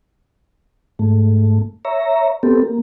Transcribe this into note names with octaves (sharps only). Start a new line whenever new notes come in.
G#2 A3
C#5 E5 A#5
B3 C4 G4 A4
A#3